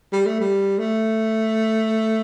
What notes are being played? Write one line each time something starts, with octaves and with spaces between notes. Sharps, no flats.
G3
A3
G3
A3